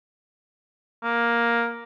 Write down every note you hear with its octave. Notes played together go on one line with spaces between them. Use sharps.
A#3